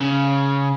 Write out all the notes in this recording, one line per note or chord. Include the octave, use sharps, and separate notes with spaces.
C#3